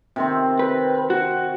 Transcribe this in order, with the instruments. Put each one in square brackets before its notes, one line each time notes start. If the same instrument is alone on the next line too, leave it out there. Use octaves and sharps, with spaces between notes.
[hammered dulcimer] C3 D#3 C4
[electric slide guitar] B4
F#4